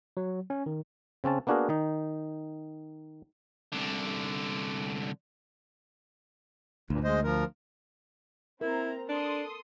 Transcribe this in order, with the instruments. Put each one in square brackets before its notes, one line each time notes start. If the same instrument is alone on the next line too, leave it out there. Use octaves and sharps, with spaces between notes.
[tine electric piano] F#3
C#4
D#3
[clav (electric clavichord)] C#3 C4 C#4 A5
A#3 B3 D4 F#4 G#4 A#4
D#3 D#4
[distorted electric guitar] C2 D3
[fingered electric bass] D2 [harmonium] G2 A#2
[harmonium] G#3 C5 D#5
F3 A#4
[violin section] C4 A#5 [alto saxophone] E4 [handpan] A#4
[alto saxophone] D4 [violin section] A4 C6 D#6